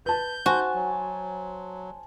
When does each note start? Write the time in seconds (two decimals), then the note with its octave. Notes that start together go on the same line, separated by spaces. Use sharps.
0.06 B4 A5 G6
0.46 F#4 C5 G#5 A5
0.74 F#3